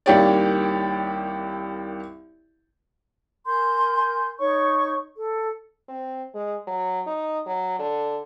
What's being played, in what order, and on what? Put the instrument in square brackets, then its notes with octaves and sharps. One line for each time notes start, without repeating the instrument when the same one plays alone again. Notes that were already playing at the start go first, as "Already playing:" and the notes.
[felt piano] C2 D#3 A#3 G4 C#5 D5
[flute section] A#4 G#5 C6 G6
D#4 C#5 C#6
A4
[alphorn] C4
G#3
F#3
D#4
F#3
D3